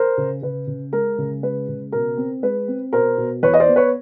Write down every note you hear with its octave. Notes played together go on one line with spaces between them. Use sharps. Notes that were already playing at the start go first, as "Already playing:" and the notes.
Already playing: A#4 C5
C#3
C#3 B4
C#3
G#3 A#4
C#3
G#3 B4
C#3
B2 A#4
C4
G#3 B4
C4
B2 A#4 C5
B2
E2 B4 C#5
D#5
C5 D5
B3
B4 C#5